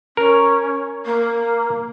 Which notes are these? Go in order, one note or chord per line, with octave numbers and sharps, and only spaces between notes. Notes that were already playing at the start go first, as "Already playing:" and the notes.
C#4 A#4
A#3